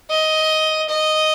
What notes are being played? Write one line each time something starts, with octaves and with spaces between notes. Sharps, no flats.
D#5
D#5